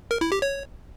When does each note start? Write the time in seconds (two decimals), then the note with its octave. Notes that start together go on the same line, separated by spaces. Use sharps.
0.11 A#4
0.21 E4
0.32 G4
0.42 C#5